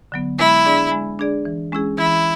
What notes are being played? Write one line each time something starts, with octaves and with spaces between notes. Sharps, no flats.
D3 F#3 B3
G#3 E4
D4 G#4 D5
G#3
D4 G#4 D5
E3
G#3 C#4 E4 G#4
E3 E4